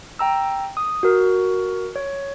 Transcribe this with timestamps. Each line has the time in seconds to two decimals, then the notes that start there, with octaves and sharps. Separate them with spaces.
0.19 G5 A#5 E6
0.77 D#6
1.03 F#4 A#4
1.96 C#5